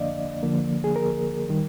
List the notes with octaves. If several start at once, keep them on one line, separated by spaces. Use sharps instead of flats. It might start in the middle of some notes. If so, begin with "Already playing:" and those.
Already playing: F2 D3 F3 A#3 D4 D5 D#5 F5
D3 F3 A#3
G#4
A#4
D#3 G3